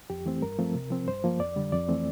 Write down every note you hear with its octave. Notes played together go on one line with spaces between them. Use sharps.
F2 G4
E3 A3 C4
G2 A#4
F3 A3 C4
C3
F3 C4
G2 C5
F3 A#3
F2 D5
D3 G3
F2 D5
E3 A3 C4